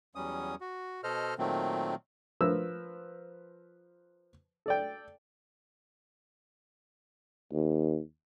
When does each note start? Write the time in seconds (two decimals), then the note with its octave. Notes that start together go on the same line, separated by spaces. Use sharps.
0.15 E2 F#3 G3 C#4 D#6
0.61 F#4
1.04 B2 A4 C5 D#5 F6
1.38 A#2 D#3 F#3 A3 C4
2.41 F3 A#4 B4 E6
4.66 A4 D5 G5
7.53 D#2